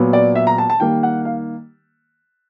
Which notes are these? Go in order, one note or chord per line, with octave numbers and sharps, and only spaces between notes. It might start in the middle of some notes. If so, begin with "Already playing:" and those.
Already playing: A#2 F#3 B3
D5
E5
A#5
A5
A5
D#3 G3 A#3 G5
F#5
F5